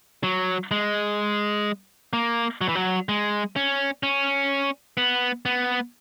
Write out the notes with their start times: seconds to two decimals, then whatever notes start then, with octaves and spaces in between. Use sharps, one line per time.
0.23 F#3
0.71 G#3
2.13 A#3
2.61 F#3
2.69 E3
2.75 F#3
3.09 G#3
3.56 C#4
4.03 C#4
4.97 B3
5.46 B3